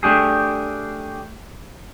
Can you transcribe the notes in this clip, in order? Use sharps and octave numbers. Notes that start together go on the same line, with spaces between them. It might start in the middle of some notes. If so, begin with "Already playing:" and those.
A3 D4 G4 G#4